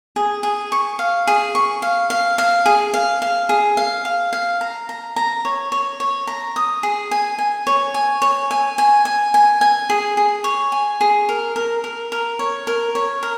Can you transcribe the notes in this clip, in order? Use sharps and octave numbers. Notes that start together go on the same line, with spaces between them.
G#4
G#4
C#6
F5
G#4
C#6
F5
F5
F5
G#4
F5
F5
G#4
F5
F5
F5
A#5
A#5
A#5
C#5
C#5
C#5
A#5
D#6
G#4
G#5
G#5
C#5
G#5
C#5
G#5
G#5
G#5
G#5
G#5
G#4
G#4
C#5
G#5
G#4
A#4
A#4
A#4
A#4
C#5
A#4
C#5
A#4